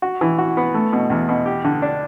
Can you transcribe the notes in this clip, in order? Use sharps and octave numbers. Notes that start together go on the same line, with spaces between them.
F#4
E3
F#4
B3
A3
B2
E2
B2
G4
D3
D4